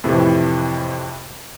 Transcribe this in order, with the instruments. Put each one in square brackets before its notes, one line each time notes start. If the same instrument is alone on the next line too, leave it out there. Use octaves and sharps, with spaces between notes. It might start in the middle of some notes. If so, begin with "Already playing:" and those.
[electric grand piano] F2 A2 C3 E3